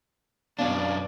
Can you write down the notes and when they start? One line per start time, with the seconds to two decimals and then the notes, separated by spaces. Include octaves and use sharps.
0.59 F#2 B2 C#4 D4 D5 F5